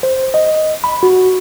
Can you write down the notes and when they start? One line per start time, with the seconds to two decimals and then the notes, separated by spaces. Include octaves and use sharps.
0.03 C5
0.34 D#5
0.84 B5
1.03 F#4